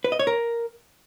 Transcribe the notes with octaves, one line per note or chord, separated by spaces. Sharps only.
B4
D#5
C#5
A#4